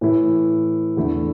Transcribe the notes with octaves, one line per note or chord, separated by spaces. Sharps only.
A2 E3 A3 E4
E2 D3 A3 E4